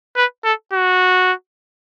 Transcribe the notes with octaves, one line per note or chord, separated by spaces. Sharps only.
B4
A4
F#4